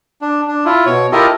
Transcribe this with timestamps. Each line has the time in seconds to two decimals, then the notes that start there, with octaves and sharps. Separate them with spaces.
0.22 D4
0.48 D4
0.65 E4 F4
0.86 B2 C#5
1.12 E4 F4 G4 A4 A#4 D#5